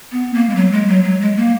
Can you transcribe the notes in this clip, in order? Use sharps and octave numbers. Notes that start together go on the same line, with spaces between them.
B3
A#3
G#3
F#3
G#3
F#3
F#3
G#3
A#3